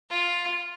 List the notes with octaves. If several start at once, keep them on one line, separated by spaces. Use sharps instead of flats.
F4